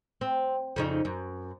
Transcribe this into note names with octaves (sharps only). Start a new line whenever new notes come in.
C4
F2 C#3 D#4
F#2